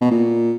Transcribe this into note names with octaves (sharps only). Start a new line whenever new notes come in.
B2
A#2